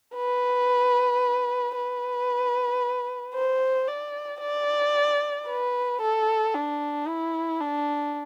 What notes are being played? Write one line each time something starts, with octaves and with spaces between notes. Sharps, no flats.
B4
B4
C5
D5
D5
B4
A4
D4
E4
D4